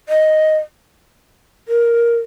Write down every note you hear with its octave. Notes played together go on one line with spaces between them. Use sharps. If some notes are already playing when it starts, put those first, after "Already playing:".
D#5
A#4